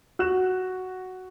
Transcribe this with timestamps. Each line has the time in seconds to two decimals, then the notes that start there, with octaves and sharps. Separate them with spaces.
0.19 F#4 F#6 E7